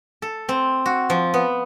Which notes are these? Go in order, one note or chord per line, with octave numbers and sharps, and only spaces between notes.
A4
C4
F#4
F3
B3